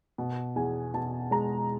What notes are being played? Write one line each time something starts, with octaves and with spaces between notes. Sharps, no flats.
B2
E2 G#5
B2 A5
G#3 A#5